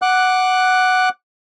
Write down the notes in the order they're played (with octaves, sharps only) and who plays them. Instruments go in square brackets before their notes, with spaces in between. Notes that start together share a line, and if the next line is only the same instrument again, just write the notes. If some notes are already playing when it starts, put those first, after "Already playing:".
[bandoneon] F#5 D6 F#6